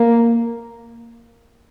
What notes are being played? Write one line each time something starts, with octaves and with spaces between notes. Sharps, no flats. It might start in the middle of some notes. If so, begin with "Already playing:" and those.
Already playing: A#3